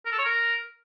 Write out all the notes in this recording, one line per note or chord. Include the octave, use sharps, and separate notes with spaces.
A#4
A4
C#5
A#4